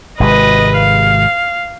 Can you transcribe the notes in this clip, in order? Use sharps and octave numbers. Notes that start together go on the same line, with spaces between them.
G#1 C3 G#3 B4 D#5
F5